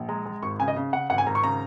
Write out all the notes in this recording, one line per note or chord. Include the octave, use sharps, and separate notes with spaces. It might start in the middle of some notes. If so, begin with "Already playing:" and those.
Already playing: A#1
G#3 A#5
G#3
G#1 C#6
C#3 G#5
D#5
C#3
C#3 F#5
G#1 F#5
G#5
G#1 A#5
C#6
C#3 A#5